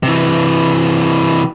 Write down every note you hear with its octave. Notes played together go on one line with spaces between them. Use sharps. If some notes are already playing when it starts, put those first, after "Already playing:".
C3 E3